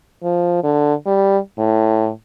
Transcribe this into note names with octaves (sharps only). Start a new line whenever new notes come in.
F3
D3
G3
A2